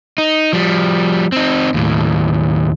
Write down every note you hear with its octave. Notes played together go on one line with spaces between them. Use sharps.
D#4
F3 G3
C4 D#4
D#2 A2